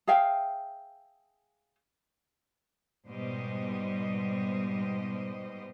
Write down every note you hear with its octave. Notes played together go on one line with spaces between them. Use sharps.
G#4 E5 F5 G5
G#2 B2 G3 C5 D#5